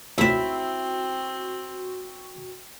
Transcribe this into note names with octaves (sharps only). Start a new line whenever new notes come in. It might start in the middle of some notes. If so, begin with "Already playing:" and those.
D2 A#2 C4 E4 F#4 E5